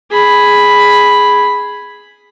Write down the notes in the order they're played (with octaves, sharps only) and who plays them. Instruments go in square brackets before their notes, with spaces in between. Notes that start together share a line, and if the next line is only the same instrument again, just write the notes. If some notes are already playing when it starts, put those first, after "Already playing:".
[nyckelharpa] G#4 B5